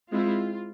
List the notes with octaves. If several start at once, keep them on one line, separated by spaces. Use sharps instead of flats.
G#3 C4 E4 F4